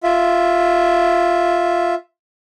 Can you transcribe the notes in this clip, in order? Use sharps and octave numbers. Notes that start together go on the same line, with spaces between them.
F4 E5